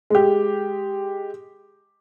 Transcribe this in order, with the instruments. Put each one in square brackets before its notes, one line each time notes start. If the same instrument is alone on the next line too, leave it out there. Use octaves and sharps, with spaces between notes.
[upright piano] G#3 G4